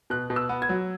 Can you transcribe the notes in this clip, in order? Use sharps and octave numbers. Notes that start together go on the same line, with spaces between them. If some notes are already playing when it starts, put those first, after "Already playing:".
B2 F#6
B2
E6
B3
G#6
F#3